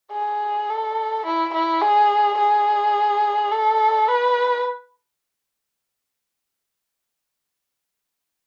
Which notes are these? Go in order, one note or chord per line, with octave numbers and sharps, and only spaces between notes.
G#4
A4
E4
E4
G#4
G#4
A4
B4